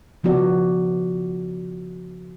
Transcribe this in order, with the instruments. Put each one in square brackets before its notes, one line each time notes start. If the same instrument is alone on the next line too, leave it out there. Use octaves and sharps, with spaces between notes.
[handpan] C#3 F3 B3 F#4 D5